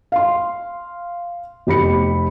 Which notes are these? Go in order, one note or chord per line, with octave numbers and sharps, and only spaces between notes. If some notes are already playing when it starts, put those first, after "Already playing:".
F5 C6
F1 G4 B5 C#7